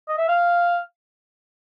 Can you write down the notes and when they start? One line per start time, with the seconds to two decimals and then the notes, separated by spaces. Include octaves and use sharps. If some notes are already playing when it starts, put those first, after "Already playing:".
0.08 D#5
0.18 E5
0.28 F5